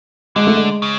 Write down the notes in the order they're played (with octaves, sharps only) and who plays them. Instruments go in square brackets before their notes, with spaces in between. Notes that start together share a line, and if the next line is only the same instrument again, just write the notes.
[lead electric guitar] D3 [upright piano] G#3
[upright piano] A3
G#3
[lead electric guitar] C#3